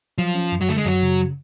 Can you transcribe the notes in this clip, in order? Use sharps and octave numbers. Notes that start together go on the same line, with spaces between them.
F3 F#3
C#4
F#2
F#3
D3 A3
G#3
F#2 F#3
C#3